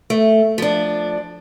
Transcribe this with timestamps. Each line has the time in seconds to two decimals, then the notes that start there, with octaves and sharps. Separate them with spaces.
0.10 A3
0.58 F3 D4